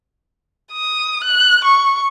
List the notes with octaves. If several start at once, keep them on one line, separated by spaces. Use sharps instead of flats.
D#6
F#6
C#6